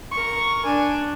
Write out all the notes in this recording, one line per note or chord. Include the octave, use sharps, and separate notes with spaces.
A#4 C#6
D4 G#5